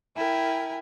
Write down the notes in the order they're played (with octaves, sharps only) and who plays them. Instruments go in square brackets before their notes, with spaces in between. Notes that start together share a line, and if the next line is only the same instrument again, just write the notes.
[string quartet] E4 A#4 G5 G#5